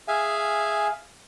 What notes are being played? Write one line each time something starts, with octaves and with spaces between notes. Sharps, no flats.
G#4 E5 F5 G#5